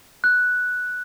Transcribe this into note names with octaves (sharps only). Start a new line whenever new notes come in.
F#6